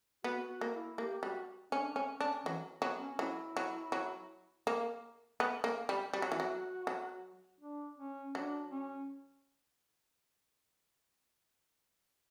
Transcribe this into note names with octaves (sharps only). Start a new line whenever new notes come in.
B3 F#4
F#4
A#3
E4
A#3 G4
G3 F#4
C#4 D4
C#4
C#4 D4
E3 F#3
F#3 B3
C#4
F#3 E4
F#3
F#3
A#3
B3
A#3
G3
G3 F#4
F#3
E3
F#3
F#3
D4
C#4
F#3 D4
C#4